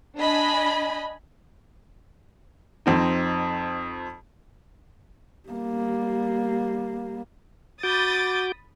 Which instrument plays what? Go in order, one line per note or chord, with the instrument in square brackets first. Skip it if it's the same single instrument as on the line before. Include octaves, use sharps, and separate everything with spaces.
[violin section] D4 D#5 G#5 B5
[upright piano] F2 C4 D#4
[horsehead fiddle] G3 A#3
[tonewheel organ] F#4 D6 G6 [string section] B5 D#6 A6